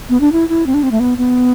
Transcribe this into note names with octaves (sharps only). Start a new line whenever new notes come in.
B3
D4
E4
E4
C4
D4
C4
A3
B3
B3